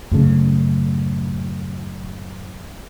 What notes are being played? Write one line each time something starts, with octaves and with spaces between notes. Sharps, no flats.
F#2 A2 C#3